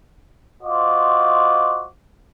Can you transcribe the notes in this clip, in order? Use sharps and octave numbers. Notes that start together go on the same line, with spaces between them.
F4 F#4 C5 D#5 D6